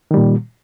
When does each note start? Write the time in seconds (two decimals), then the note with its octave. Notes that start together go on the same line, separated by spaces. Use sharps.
0.11 D#3
0.14 G3
0.17 A#2